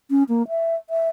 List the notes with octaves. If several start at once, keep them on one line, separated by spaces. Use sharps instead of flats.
C#4
A#3
E5
E5